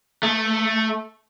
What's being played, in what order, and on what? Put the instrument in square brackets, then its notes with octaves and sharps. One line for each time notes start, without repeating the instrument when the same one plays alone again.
[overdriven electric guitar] A3